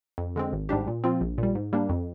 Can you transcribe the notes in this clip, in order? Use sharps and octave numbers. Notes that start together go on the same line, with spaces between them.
F2
D3 G#3 C4
G#1
G#2 G3 D4 G4
A#2
F3 C4 F4
A#1
A#2 G3
G#2
G3 A#3 D4
F2